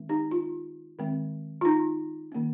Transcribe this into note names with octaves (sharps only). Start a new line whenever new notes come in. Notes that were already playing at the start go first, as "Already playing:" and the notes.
Already playing: D#3 G#3 C4
D#4 G4
F4
D#3 G#3 C4
F4
D#4
D#3 A#3 C#4